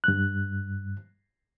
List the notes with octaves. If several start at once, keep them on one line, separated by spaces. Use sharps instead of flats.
G2 F#6